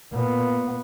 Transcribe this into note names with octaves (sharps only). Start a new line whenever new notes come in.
A#2 B3